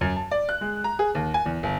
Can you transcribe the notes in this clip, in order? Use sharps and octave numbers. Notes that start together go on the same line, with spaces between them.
F#2
A5
D5
F#6
G#3
A#5
G#4
D#2
G#5
E2
G1